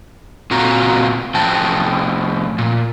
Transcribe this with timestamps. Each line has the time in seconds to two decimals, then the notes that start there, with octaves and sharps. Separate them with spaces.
0.51 A#2 C4 F4 F#4 A#5
1.35 A2 F3 G5 A5
2.58 A#2